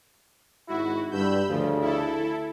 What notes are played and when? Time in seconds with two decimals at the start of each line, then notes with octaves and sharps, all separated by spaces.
0.68 G#1 G#2 E4 F#4
1.11 G2 D3 B5 E6 G6
1.48 D2 C#3 F3
1.81 E4 A4